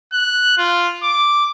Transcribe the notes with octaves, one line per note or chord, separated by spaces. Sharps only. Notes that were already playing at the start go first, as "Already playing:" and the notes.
F#6
F4
D6